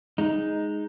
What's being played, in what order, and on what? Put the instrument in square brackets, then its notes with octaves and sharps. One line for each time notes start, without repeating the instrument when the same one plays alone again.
[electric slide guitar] G#3 D#4